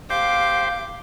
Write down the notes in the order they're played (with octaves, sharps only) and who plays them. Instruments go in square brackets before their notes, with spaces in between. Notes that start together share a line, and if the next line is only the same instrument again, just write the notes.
[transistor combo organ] G4 C5 G5 [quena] F5 [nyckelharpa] D6